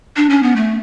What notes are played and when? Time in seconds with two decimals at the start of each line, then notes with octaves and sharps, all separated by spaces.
0.16 D4
0.30 C#4
0.43 B3
0.56 A3